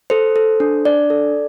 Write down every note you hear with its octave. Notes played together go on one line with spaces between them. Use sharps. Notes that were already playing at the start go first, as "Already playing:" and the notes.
A4 C5
A4
D4
D4 D5
A4